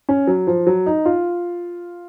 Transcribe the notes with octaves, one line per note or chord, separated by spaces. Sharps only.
C#4
F#3
F3
F#3
D#4
F4